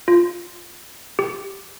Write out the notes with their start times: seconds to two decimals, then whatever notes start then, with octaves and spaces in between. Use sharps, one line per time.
0.08 F4
1.19 G4